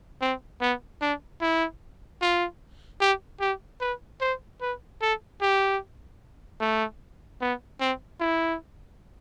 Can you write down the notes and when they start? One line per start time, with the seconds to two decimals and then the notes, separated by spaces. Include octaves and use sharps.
0.22 C4
0.61 B3
1.02 D4
1.41 E4
2.22 F4
3.01 G4
3.41 G4
3.81 B4
4.21 C5
4.61 B4
5.02 A4
5.42 G4
6.61 A3
7.41 B3
7.80 C4
8.20 E4